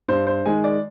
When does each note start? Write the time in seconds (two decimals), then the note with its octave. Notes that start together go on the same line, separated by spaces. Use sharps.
0.08 G2 C5
0.27 C5
0.46 D#3 G#3 G#5
0.64 D5